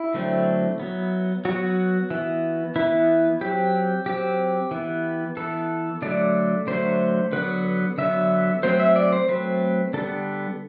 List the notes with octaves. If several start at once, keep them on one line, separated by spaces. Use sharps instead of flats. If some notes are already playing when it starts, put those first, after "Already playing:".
Already playing: E4
D3 F#3 A3 C4
F#3 B3
F#3 B3 F#4
E3 B3
E3 B3 E4
F#3 C4 G4
F#3 C4 G4
E3 B3
E3 B3 A4
D3 F#3 A3 D5
D3 F#3 A3 C5
D3 F#3 B3 B4
D3 F#3 B3 E5
F#3 A3 C4 C5
E5
D5
C5
F#3 A3 C4 B4
D3 G3 B3 A4